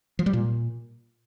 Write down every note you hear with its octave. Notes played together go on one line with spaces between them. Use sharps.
F3
G3
A#2